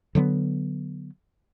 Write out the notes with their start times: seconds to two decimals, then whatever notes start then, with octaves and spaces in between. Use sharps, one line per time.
0.15 D3 F#3 A3 B3